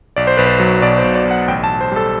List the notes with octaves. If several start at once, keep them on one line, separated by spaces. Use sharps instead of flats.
B1 D5
C5
B1 B4
C5
F#3
B2 D5
C5
B1
D5
B1
F#5
A1 G5
A5
A1
C5
G3 A4